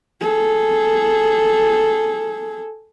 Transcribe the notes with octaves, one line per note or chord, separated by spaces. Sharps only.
G#4 A4